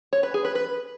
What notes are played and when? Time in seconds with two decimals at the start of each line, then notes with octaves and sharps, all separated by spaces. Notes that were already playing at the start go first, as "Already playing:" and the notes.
0.13 C#5
0.23 B4
0.34 G#4
0.45 B4
0.55 B4